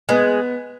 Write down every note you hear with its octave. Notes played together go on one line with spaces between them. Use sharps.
G#3 B3